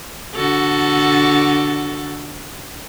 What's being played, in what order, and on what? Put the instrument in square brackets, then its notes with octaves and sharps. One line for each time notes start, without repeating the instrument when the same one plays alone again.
[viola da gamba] D3 F#4 A4